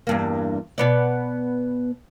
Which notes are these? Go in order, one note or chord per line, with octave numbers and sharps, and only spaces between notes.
E2 G2 A#3
B2 B3 D5